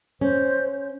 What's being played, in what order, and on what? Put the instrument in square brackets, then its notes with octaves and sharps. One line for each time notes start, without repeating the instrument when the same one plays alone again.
[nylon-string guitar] C#4 [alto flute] C5